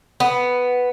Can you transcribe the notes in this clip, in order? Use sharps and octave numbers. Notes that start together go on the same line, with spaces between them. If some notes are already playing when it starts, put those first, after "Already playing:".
B3